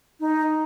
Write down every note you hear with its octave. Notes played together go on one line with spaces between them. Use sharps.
D#4